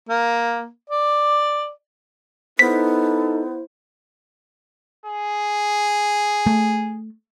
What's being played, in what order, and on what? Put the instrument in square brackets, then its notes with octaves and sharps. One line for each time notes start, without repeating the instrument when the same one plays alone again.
[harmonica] A#3
D5
[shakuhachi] B3 [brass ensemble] D#4 A4 [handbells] E4 C5 [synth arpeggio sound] B6
[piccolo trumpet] G#4
[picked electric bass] A3